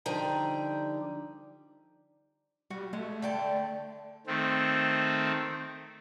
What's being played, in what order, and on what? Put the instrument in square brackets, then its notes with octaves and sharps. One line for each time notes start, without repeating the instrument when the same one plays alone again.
[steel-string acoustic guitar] D3 F3 G3 D#4 G5 A#5
[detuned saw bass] G3 [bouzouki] F#4
[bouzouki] G#3 [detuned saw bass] A3
[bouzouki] D3 G5 A5
[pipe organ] D#3 A3 C4